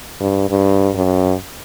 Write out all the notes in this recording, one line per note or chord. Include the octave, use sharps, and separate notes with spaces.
G2
G2
F#2